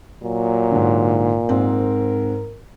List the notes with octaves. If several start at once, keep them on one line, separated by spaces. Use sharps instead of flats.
A#2 F#3
G#2 D3
G#2 C4 A#4